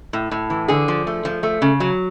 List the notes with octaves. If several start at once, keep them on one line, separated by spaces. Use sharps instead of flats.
A2
A2
E3
D3 G#4
F3
A3
F3
A3
C#3
F#3